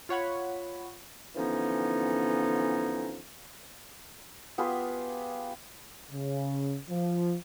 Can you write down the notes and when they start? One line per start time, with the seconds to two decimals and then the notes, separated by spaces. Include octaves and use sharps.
0.09 F4 C#5 F#5 B5
1.36 D3 E3 F3 B3 C#4 D#4
4.58 B3 F4 G4 G#4
6.11 C#3
6.89 F3